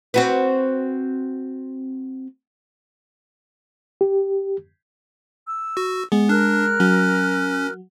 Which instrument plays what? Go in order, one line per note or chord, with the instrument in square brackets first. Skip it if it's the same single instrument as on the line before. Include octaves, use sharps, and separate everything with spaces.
[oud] C4 F#4 B4
[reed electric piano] G4
[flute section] E6
[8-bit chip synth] F#4
[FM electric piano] G#3 [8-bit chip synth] B3
[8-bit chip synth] D4 [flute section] A#4 F6 F#6
[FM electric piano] F#3 [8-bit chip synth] C#4